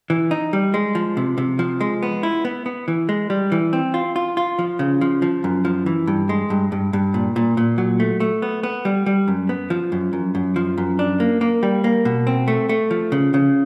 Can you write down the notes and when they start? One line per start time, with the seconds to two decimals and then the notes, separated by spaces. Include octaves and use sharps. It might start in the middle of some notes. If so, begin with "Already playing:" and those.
0.10 E3
0.31 D#4
0.53 G3
0.74 G#3
0.95 F3
1.17 C3
1.38 C3
1.59 F3
1.81 G#3
2.03 B3
2.23 E4
2.45 B3
2.66 B3
2.88 E3
3.09 G#3
3.30 G3
3.52 E3
3.73 C4
3.94 F4
4.16 F4
4.37 F4
4.59 F3
4.79 C#3
5.01 F3
5.22 F3
5.44 F#2
5.65 F3
5.86 E3
6.07 G2
6.29 G#3
6.50 G2
6.72 G2
6.93 G2
7.14 A#2
7.36 A#2
7.57 A#2
7.78 F#3
8.00 A3
8.20 A3
8.42 B3
8.63 B3
8.85 G3
9.06 G3
9.28 F#2
9.49 B3
9.70 F3
9.92 F#2
10.13 F#2
10.35 F#2
10.56 F3
10.78 F#2
10.99 D4
11.20 A#3
11.41 A#3
11.63 G3
11.84 A#3
12.05 B2
12.27 C4
12.48 A3
12.69 A3
12.91 F3
13.12 C#3
13.34 C#3